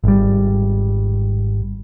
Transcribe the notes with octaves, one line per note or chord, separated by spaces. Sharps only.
G#1 G3